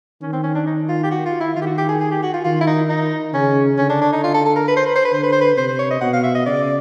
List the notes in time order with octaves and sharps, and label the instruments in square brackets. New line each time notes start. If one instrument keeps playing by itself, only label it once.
[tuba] D#3 [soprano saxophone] C#4
[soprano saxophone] C4
C#4
D4
D#4
F4
G4
F#4
F4
E4
[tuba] D#3 [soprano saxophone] F4
[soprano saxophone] G4
F#4
G4
G#4
G#4
G4
F#4
F4
[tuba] D#3 [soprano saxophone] F4
[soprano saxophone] E4
D#4
D#4
[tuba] C#3 [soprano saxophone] C#4
[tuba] D3 [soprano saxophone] C#4
[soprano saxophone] D4
D4
D#4
F4
A4
A4
A#4
B4
C5
B4
C5
B4
[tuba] D3 [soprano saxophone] C5
[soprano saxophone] B4
C5
B4
[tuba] C3 [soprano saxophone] C5
[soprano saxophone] C5
C#5
D#5
[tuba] B2 [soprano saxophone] F#5
[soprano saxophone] F5
E5
D#5
[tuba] C#3 [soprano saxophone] D5